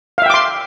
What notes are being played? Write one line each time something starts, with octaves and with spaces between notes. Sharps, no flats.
E5 F5 G5 C6 D6